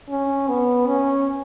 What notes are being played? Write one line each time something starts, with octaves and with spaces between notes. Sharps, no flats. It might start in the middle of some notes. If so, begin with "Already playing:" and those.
C#4
B3
C#4